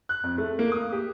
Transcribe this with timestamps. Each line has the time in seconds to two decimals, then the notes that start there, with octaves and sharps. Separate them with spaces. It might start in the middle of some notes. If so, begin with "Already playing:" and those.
0.09 F#6
0.23 F2
0.38 A3
0.59 A#3
0.72 D#6
0.92 G4